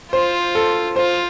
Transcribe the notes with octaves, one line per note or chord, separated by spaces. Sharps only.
F4 C5
A4
F4 C5